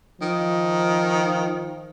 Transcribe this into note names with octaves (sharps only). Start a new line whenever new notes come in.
D#3 F3